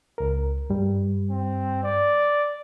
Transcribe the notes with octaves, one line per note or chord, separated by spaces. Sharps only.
C#2 A#4
G2 G3
C4
D5